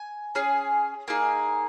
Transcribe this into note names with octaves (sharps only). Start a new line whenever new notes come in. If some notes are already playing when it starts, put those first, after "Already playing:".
Already playing: G#5
C#4 G#4
A#3 D#4 G#4